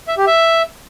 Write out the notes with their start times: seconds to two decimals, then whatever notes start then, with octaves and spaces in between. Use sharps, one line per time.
0.08 E5
0.17 G4
0.27 E5